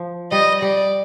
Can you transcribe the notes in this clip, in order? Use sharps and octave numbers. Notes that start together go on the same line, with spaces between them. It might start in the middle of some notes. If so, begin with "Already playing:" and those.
Already playing: F3
G3 D#5
G3 D5